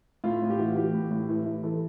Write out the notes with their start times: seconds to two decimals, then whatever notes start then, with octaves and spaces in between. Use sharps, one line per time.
0.24 A2 F4
0.42 A2
0.50 G4
0.59 E3 F#4
0.76 E3 G4
0.93 A2
1.11 A2
1.29 E3
1.45 E3
1.63 E3 A4